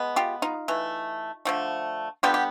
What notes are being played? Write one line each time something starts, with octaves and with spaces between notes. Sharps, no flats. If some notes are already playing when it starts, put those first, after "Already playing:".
Already playing: G#3 B3
F4 G4
D#4 F4
E3 A3
D3 F3 A3
D3 G3 B3 F4 G4
G4